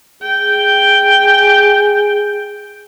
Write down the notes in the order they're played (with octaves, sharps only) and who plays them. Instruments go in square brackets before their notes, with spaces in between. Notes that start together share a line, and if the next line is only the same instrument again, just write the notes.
[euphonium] G#4 [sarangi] G5